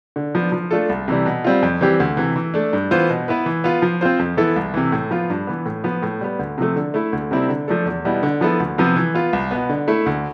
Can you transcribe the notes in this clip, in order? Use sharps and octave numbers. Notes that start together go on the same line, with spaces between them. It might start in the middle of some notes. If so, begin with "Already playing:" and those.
D3
F3 B3 D4
F3
A3 D4 F4 A4
C2
C3 E3 G3
B2
G3 C4 F4
F2
E3 G3 C4 G4
D2
C3 E3
E3
A3 D4
G2
E3 B3 F4 C5
B2
B3 E4 B4
E3
B3 F4
F3
C4 F4 C5
F2
E3 B3 E4 A4
C2
C3 E3
A2
F3 B3 F4
G2
E3 B3
A2
F3 B3
A2
G3 B3
D2
C3 F3 A3
D3
A3 E4
D2
C3 G3 C4 E4
D3
F3 A3 D4 A4
E2
B2 G3 B3 E4
D3
F3 B3 E4 A4
D2
C3 F3 B3
E3
B3 F4
C2
B2 B3
D3
A3 E4
D2